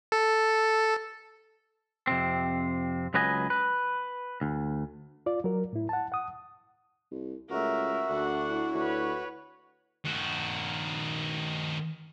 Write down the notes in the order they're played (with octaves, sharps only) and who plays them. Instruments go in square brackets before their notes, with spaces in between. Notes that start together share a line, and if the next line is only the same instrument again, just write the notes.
[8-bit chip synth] A4
[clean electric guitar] F2 C3 C4
C#2 F#3 B4 D#5 G#5
B4
D2
[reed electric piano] F4 D5
F#3 A#4
A2 E4
F#5 A5
F#5 D#6
[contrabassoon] C2
[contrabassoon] C#2 [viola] A3 A#4 [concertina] F#4 [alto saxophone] E5
[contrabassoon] D2 [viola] D4 F#5
[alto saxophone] E4
[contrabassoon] D2 [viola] B4 C#5
[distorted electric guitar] D#3 F#4